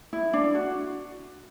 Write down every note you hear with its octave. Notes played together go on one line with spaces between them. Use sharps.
E4
D4
F#4